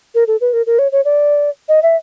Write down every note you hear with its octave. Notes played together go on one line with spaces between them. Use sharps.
A#4
A4
B4
A#4
A#4
C#5
C#5
D5
D#5
E5